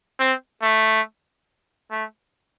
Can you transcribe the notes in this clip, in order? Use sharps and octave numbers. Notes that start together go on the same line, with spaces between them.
C4
A3
A3